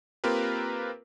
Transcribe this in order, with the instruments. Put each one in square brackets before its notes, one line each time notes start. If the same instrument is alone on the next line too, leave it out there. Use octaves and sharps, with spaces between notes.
[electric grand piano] A#3 C4 F4 G4 A#4 B4